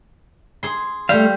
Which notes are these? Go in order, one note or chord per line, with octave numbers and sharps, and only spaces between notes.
G#4 C6
G3 A3 F5